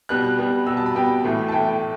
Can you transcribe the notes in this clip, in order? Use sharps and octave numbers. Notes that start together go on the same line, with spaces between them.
B2 G3 B3 F#6
B2 G3 B3
B2 G3 B3 E6
A5
B5
B2 G3 B3 G5
A2 E3 A3
A5
A2 E3 A3 G5